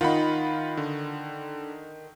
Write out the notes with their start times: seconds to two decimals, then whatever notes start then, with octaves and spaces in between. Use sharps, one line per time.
0.01 D#3 D#4 F4 F#5 B5
0.77 D3